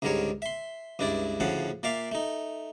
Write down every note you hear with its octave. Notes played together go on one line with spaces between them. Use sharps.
C#2 G#2 D3 G3 A#4 C#5
E5 C6
C#2 G2 D4 E4 D5
D2 A2 C#3 F3 F#5 A5
A#2 D5 E5 F5 D6
A3 D#4